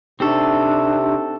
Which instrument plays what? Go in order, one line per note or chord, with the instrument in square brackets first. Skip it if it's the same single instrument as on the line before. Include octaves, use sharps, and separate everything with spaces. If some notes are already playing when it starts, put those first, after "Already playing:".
[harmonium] C3 [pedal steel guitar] C4 A4 [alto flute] D4 [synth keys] D#4 G4 C#6